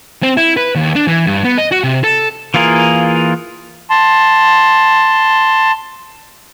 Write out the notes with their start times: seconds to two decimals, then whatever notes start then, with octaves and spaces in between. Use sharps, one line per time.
0.23 C4
0.37 E4
0.57 B4
0.75 D#2
0.96 D4
1.08 E3
1.27 G2
1.45 B3
1.58 D#5
1.71 F#4
1.84 C3
2.04 A4
2.54 E3 A#3 F4 G#4 A#4
3.90 A5 C6